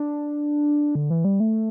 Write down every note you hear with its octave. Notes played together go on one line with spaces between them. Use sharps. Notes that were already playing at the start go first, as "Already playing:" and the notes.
Already playing: D4
D3
E3
G3
A3